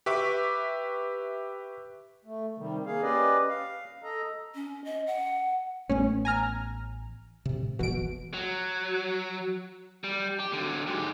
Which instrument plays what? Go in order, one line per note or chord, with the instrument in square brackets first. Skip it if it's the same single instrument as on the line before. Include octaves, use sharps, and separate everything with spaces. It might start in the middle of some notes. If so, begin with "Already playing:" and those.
[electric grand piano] G4 B4 E5 C#6 D6
[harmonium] A3
C3 D#3 G3
A#3 G#4 F5
C#4 G4 B4 D5 D#5
F5
A4 D#5 A#5
[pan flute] C#4
D#5
F#5
[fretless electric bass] A1 A3 B3 [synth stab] C#4
[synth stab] G#5 A#5 F6
[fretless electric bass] A2 C3
[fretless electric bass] D#1 G#1 E3 [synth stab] B2 D7
[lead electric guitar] F#3
G3
G4
D3 F#3
G#2 G4